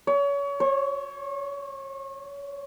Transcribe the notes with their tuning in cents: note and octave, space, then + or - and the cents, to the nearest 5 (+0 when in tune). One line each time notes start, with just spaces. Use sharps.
C#5 +30
C#5 -35